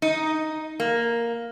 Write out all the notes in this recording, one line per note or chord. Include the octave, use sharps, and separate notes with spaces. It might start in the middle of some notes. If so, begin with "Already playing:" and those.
D#4
A#3